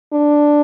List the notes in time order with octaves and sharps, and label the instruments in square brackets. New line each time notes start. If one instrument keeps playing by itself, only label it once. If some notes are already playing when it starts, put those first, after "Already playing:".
[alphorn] D4